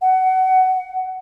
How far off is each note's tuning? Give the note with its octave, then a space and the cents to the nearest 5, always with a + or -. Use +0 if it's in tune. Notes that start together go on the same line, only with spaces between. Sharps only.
F#5 +20